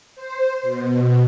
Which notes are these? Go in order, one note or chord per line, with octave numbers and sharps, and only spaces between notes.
C5
B2